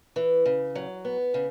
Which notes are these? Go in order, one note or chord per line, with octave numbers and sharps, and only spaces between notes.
E3
C#3
F#3
B3
C#3